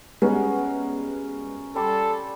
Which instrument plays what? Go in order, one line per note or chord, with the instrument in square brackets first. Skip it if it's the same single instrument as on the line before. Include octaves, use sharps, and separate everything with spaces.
[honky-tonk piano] G3 G#3 B3 [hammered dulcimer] C#4 F#4 A#4
[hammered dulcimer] G3 D5 C6 [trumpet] A4